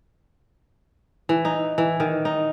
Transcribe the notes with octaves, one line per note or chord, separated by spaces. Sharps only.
E3
D#4
E3
D#3
D#4